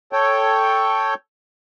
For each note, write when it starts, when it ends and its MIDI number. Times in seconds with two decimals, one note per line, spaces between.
0.12 1.14 69
0.12 1.14 73
0.12 1.14 79